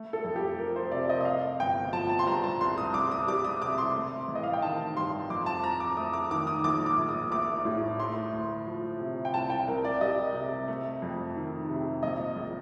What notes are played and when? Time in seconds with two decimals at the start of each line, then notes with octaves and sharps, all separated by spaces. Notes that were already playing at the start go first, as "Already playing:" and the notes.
Already playing: A3
0.13 A4
0.24 F2
0.36 G4
0.58 F3 A#4
0.76 C5
0.92 C3 D5
1.09 D#5
1.21 D#5
1.25 A3 F5
1.60 G1 G5
1.93 F3 A5
2.09 A5
2.19 C6
2.26 G2 A#5
2.44 A5
2.61 C2 C6
2.78 D#6
2.94 C2 D6
3.11 D#6
3.27 G3 D6
3.44 D#6
3.61 C3 D6
3.78 C6
3.95 A3
4.28 A1
4.35 D#5
4.43 F5
4.53 G5
4.62 D#3 A5
4.96 G2 C6
5.30 F2 D6
5.46 A5
5.63 F2 A#5
5.80 D6
5.97 A3 D#6
6.13 D6
6.31 D#3 D6
6.47 D#6
6.64 A#1 D6
6.86 D6
6.98 A#1
7.09 D#6
7.31 A3 D6
7.65 A2
7.99 A3 C6
8.33 D2
8.67 F3
9.00 C3
9.25 G5
9.34 C2 A5
9.50 G5
9.68 C2 A#4
9.85 D5
10.01 G3 D#5
10.34 C3
10.68 A3
11.02 F2
11.36 D#3
11.69 C3
12.03 A#1 D#5
12.36 A#1